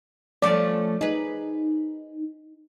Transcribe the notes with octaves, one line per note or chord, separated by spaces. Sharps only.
F3 A3 C#4 D5
D#4 G#4 B4